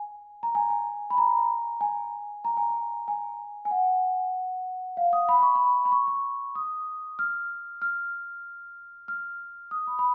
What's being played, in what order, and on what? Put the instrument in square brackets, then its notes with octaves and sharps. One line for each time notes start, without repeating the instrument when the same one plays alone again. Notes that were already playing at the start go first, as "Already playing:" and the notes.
Already playing: [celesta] G#5
A#5
G#5
G#5
B5
A#5
G#5
A#5
G#5
A#5
G#5
G#5
F#5
F5
D#6
B5
C#6
B5
B5
C#6
C#6
D#6
F6
F6
F6
D#6
B5
B5